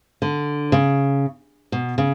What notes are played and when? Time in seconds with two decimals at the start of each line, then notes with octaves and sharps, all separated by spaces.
0.22 D3
0.72 C#3
1.72 B2
1.98 C#3